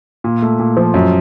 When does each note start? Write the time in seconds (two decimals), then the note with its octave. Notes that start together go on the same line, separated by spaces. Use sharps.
0.24 A#2
0.42 A3
0.59 A#2
0.77 F3
0.94 F#2